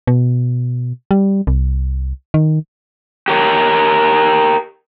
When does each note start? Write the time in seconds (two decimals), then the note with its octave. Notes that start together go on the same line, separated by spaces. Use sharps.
0.07 B2
1.11 G3
1.47 C2
2.34 D#3
3.28 G4 A#4 C#5